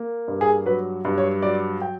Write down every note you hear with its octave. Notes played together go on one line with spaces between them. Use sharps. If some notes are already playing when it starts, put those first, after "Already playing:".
Already playing: A#3
G2
G#4
F#3 B4
G2
C#5
F#3 D5
G5